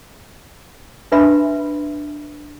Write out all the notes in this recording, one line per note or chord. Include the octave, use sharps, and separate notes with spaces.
D4 B4 E5 B5 C6